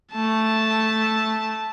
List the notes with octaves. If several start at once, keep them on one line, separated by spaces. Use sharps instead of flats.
A3 A5